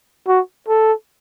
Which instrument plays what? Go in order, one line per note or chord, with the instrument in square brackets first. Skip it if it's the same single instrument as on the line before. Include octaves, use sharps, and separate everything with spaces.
[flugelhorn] F#4
A4